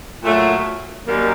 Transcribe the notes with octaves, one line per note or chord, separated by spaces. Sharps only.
A#2 F#3 A3
F#2 D#3 G3 A#3